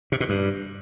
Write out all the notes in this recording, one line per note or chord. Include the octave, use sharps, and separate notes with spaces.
C3
B2
G2